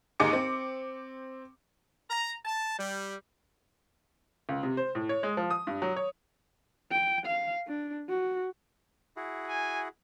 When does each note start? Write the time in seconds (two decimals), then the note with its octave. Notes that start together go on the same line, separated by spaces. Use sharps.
0.20 D#2 G#2 D#4 G#4 D6 C#7
0.33 C4
2.10 A#5
2.45 A5
2.79 G3
4.49 C#2
4.63 C3
4.77 C5
4.95 A2
5.09 C#5
5.23 G#3
5.37 F3
5.51 D#6
5.67 G2
5.82 F#3
5.96 C#5
6.91 G5
7.26 F5
7.68 D4
8.09 F#4
9.16 E4 F#4 G#4
9.48 G#5